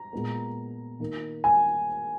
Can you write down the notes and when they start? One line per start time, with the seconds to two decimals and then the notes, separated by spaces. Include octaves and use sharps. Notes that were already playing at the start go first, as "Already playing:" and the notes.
Already playing: A#5
0.13 A#2 G#3 B3
1.00 D#3 A#3
1.44 G#5